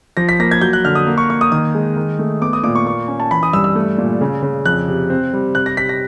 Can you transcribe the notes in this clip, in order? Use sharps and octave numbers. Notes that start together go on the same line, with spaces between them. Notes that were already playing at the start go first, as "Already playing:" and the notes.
F3 A#6
B6
A#3 A#6
G#6
F#3 G6
F#6
D3 F6
D#6
A#3
C#6
A#3 C#6
D#6
D#3 D#6
G#3
D#3
A3
B3 D6
D#6
A#2 D6
C#6
A#3 C#6
C#4
A5
E3 B5
D#6
G2 E6
E6
A3
A#2
C#3
C#3
F2 F#6
C3
C4
G3
C3 F#6
A#6
C3 B6
A#6